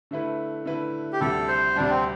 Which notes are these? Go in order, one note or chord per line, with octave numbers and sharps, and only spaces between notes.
D3 A3 E4 B4
D3 A3 E4 B4
G4
D2 C3 G3 A4
C5
D2 C3 G3 D4
C4